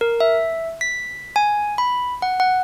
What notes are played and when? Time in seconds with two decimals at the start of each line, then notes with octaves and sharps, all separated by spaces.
0.01 A#4
0.20 E5
0.81 B6
1.36 G#5
1.78 B5
2.22 F#5
2.40 F#5